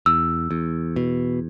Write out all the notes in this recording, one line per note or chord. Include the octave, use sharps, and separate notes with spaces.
E2 E6
E2
B2